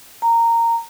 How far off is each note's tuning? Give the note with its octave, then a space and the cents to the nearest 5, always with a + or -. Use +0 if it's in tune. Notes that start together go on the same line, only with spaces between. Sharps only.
A#5 -15